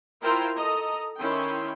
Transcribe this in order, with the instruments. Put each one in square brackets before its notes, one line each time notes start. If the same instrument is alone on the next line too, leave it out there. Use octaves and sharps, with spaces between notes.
[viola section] E4 F4 A#4 C5 G5 A#5
A4 D#5 A#5
D#3 C#4 E4 G5 C6